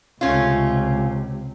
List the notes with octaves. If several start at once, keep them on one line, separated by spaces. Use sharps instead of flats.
C#2 C3 A3 C#4 F4